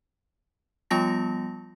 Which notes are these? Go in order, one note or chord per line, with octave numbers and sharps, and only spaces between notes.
F3 G3 B3 F4 A5 A#6